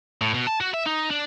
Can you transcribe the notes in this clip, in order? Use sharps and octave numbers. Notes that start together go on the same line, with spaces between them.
A2
B2
A5
F#4
E5
D#4
D4